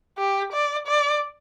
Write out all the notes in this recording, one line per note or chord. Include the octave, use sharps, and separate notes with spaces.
G4
D5
D5